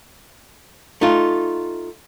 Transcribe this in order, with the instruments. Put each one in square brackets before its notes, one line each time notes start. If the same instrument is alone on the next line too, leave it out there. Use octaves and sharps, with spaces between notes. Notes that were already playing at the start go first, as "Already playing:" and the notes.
[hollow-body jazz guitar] A3 D#4 F4